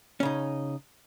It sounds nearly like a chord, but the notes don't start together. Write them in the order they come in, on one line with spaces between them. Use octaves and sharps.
C#4 C#3 D#4